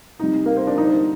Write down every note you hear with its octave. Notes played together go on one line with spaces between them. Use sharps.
C3 G3 D#4
A#3
C4
D4
D3 G3 D#4